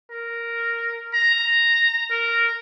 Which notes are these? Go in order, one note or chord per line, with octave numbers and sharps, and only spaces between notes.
A#4
A#5
A#4